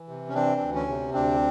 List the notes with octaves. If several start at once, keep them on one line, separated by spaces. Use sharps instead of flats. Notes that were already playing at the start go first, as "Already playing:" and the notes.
Already playing: E3
C3
C#4
E3 C4 D4
D2
C#4
C3
D2 C4 D4